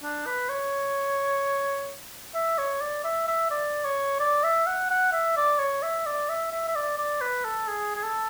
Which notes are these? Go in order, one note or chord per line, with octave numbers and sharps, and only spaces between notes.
D4
B4
C#5
E5
C#5
D5
E5
E5
D5
C#5
D5
E5
F#5
F#5
E5
D5
C#5
E5
D5
E5
E5
E5
D5
D5
B4
A4
G#4
G#4
A4